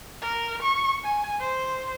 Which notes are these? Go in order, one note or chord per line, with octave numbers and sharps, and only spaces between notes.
A#4
C#6
G#5
C5